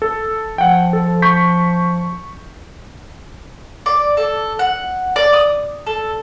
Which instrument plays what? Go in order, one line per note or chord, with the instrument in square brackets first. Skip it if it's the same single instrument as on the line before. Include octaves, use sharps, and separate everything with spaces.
[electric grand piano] A4
[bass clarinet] F3 [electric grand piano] F#5 G5
[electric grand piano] A4
C#6 G6 B6
[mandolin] D5
A4
F#5
D5
D#6
A4